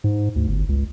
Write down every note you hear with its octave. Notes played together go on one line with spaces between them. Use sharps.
G#2
D2
G1
C#2